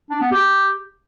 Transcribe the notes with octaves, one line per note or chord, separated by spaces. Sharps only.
D4
B3
G4